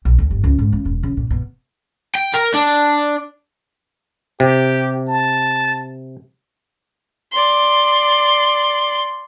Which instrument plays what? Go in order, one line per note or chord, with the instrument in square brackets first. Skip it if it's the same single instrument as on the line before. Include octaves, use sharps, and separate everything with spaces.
[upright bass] B1
D2
G1
C#2
G#2
C#3
E1
C#3
A#2
B2
[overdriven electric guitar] G5
A#4
D4
[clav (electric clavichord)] C3 [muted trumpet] G4
[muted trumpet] A5
[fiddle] D5 C6